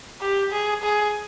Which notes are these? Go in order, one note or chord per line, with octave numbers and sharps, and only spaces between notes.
G4
G#4
G#4